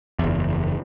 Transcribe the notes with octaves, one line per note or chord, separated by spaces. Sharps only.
F#1 E2